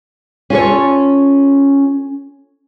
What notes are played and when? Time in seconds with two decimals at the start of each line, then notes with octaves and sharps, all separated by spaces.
0.50 C#4 F4 A4 C#5